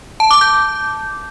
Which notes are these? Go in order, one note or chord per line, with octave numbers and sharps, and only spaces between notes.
A5
D6
G6